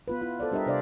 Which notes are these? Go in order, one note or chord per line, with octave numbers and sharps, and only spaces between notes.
B3 F4 B4
E4 F4
A4 C5 D5
G3 D4 G4 A#4 D#5 E5
C3 D4 C5 D5 E5 F5